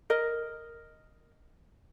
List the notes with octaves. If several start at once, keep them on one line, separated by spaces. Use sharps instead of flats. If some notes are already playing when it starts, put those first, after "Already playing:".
A#4 D#5